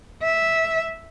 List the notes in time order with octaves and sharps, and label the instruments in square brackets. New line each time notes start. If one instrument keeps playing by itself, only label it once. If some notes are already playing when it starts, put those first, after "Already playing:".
[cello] E5